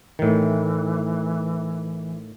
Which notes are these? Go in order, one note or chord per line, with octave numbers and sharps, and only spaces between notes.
A2 D#3 E3